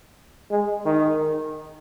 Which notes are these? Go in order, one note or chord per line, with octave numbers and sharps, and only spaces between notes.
G#3
D#3